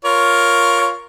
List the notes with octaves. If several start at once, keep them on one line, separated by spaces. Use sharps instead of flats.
F4 A#4 C#5